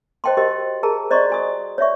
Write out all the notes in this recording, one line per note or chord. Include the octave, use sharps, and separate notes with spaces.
C5 D#5 G5 A5 C6
F#4 G4 A#4 C5 D#5 G5
G#4 A#4 A5 A#5
C5 D5 D#5 A#5 C6 C#6
F#4 G#5 D#6
C#5 D5 E5 C#6